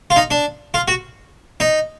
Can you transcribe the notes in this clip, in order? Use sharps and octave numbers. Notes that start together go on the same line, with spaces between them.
F4
D#4
D4
F4
F#4
D#4